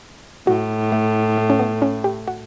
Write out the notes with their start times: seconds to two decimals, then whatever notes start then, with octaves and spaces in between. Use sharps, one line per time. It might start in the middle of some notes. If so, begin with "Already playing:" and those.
0.47 A2 F#4
0.92 A3
1.38 A3
1.50 C#4
1.59 B3
1.82 C#4
2.04 G4
2.27 F#4